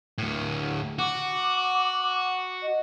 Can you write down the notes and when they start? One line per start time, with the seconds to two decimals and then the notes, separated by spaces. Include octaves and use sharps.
0.18 D2 A2
0.99 F#4 D6
2.62 D#5